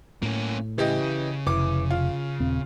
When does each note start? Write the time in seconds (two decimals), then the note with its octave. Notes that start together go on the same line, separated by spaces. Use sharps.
0.23 A2 A#3 C#4
0.78 C#3 E3 G4 D#5
1.46 F1 E3 D6
1.91 F4
2.40 D#1 C4